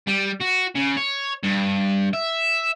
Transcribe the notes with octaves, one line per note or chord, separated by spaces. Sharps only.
G3
F#4
C#3
C#5
G2
E5